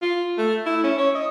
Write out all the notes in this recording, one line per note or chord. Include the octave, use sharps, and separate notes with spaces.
F4
A3
E4
C#4
C#5
D#5